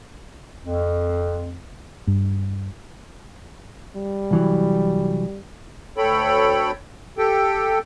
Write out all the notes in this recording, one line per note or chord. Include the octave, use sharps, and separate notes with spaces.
F2
G2
G3
C2 E3 F#3
D2 A4 C#5 G5 B5
G4 A4 G5